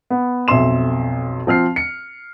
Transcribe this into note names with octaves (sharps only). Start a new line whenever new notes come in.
B3
B1 F2 E5 C6 E7
F3 C4 F6 C7
C#7